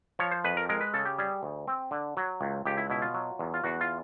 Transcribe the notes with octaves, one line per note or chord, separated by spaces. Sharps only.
F3 C#5
C5
F2 B4
A#4
G#3 A#4
B4
C#3 A4
G4
G3 G#4
D2
C4
D3
F#3
C#2
C#2 G4
E4
B2 E4
F4
F#3
E2
F4
E2 F#4
F4